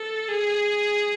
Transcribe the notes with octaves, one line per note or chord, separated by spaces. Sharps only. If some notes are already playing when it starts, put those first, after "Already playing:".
Already playing: A4
G#4